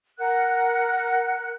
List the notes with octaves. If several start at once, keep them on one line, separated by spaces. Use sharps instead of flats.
A#4 F#5 F#6